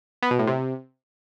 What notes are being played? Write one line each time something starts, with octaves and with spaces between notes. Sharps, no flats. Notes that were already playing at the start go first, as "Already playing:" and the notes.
B3
B2
A2
C3